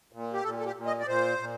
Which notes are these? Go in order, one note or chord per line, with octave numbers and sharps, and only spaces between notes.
A#2
G4
A#2 A4
A4
G4
A#2
D#5
D5
A#2 C5
A#2